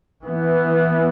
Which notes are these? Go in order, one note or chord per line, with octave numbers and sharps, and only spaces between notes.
E3 B3